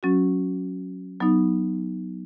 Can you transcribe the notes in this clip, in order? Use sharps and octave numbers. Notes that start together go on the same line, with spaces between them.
F#3 C#4 F#4
F#3 B3 D#4